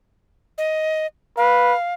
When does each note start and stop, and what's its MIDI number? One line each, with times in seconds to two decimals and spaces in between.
0.58 1.07 75
1.37 1.73 71
1.37 1.94 77